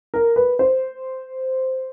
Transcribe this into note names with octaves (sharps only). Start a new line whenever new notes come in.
A#4
B4
C5